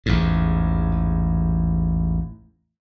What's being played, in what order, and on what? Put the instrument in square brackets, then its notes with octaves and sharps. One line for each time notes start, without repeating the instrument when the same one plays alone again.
[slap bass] A1 E2 G#2